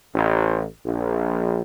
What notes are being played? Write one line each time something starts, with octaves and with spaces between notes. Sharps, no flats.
A1
A#1